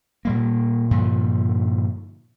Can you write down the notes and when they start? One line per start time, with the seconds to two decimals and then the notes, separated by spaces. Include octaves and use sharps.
0.25 A#2 G3 A#3
0.91 G2 A#2 D3 F3